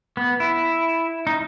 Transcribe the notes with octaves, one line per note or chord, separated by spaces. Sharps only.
B3
E4
D#4